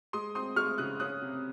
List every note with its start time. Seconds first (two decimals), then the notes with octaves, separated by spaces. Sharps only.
0.13 G#3 C6 D#6
0.35 C4 C6 D#6
0.56 G#3 C#6 F6
0.78 C#3 D#6 F#6
1.00 C#4 D#6 F#6
1.22 C3